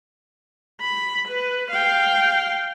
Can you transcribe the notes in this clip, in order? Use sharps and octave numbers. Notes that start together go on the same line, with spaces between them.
B5
B4
F5 G5